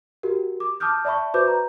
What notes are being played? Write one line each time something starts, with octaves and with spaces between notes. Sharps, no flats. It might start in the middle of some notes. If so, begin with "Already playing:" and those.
F#4 G4 A#4
D6
A5 D6 D#6 F6 G6
D5 E5 A5 B5 C#6
F#4 B4 C5 D6 G6
A#5